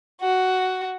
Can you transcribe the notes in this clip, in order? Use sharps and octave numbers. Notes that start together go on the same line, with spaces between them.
F#4